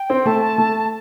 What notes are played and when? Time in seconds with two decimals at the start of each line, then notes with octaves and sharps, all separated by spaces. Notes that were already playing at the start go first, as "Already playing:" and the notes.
Already playing: G5
0.10 C4
0.26 A3 A5
0.58 A3